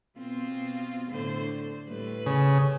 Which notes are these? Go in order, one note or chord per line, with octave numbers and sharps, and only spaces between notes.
B2 C4 F4
A2 D3 C5
A2 G3 B4
C#3